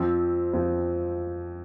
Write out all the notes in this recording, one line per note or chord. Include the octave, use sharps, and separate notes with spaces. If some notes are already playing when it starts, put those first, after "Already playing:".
Already playing: F2 F3 C4
F2 F3 C4